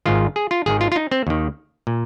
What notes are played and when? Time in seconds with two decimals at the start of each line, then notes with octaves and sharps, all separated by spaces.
0.06 G#1 G#2 D#3 F4
0.36 G#4
0.51 F4
0.66 G#1 G#2 D#3 G#4
0.81 F4
0.92 F4
0.96 D#4
1.11 C4
1.27 D#2 D#3
1.87 A#2